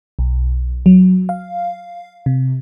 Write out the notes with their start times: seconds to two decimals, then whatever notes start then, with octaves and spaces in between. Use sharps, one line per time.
0.19 B1
0.86 F#3
1.29 F5
2.26 C3